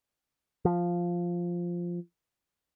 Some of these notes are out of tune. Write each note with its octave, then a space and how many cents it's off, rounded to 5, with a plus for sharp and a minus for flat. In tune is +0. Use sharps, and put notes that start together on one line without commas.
F3 +0